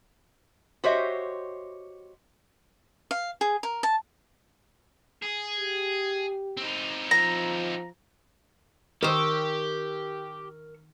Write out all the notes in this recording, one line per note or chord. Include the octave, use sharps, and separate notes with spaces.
F#4 G4 C5 C#5 D#5 E5
F5
G#4
A#4
A5
G#4
G4
C4 D#4
F3 A#5
D#3 G4 A#4 C5 C#6 E6